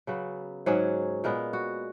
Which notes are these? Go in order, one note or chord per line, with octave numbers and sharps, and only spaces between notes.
C#3 F#3 B3
G#2 F#3 C#4 G#4
A#2 G#3 B3 A#4
F#4